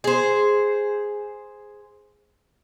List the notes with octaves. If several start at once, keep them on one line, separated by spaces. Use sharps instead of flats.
G#4 C5